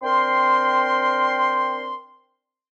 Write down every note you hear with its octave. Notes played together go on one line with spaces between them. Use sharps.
C4 D4 A#4 G5 C6